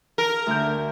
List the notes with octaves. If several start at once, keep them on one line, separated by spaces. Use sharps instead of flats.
A#4
D2 G6